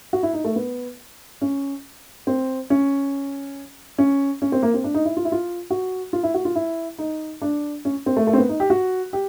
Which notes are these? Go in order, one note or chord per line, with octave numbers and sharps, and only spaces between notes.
F#4
E4
D#4
A3
B3
C#4
C4
C#4
C#4
C#4
C4
A#3
C4
D4
D#4
E4
F4
E4
F4
F#4
F4
E4
F#4
F4
E4
D#4
D4
C#4
C4
A3
A3
C4
B3
D#4
G4
F#4
G4